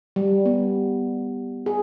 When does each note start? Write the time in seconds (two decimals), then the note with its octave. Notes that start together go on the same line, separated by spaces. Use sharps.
0.16 G3
0.46 B3
1.66 G#4